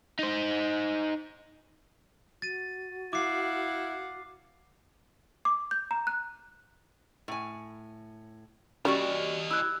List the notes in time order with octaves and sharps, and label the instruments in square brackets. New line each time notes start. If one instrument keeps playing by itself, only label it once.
[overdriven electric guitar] D#4 C5
[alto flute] F#4 [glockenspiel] A6 D#7
[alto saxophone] E4 [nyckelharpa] F5 F#5 [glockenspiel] D6 C7
[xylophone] D6
G6
A#5
F#6
[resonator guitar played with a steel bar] A2 G#5
[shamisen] G3 [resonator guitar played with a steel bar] C#4 F#4 D5 [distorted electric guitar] G4 D#5
[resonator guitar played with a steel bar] E4 [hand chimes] E6 F#6